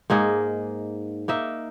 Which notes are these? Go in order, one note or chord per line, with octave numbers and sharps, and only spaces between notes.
G#2 A#3 D#4 G#4
A#3 D#4 E5